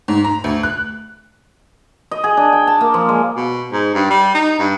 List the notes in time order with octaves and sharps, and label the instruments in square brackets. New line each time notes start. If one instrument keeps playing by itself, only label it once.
[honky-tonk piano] G#2
A#5
D2
F#6
[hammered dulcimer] D#5
G#4
D4
G5
A5
A#3
F3
G#3
[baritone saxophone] B2
G#2
G2
G3
D#4
G2